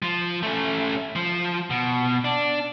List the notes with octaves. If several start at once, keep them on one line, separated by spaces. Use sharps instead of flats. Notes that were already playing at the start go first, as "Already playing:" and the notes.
F3
A3 C#4
F3
B2
D4